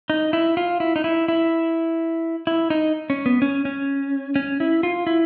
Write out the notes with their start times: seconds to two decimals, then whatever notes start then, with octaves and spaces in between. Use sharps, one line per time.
0.10 D#4
0.33 E4
0.57 F4
0.80 E4
0.96 D#4
1.04 E4
1.28 E4
2.47 E4
2.70 D#4
3.10 C#4
3.26 B3
3.42 C#4
3.65 C#4
4.36 C#4
4.60 E4
4.83 F4
5.07 E4